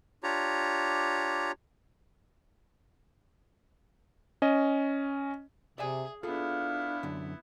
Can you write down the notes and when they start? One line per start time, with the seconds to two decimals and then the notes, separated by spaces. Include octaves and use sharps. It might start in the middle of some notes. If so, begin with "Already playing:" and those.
0.23 D4 F4 G4 C#5 A#5
4.42 C#4 D#5
5.78 C3 G#4 D5 E5 G#5
6.23 B3 D4 E4 F4 G#4 A4 F5
7.03 F#2 D3